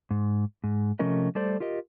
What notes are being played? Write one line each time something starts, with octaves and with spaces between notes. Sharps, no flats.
G#2
G#2
C3 F3 A3 C#4 A#4 D#5
G3 A3 A4 C5 D5
F4 G4 A#4 D#5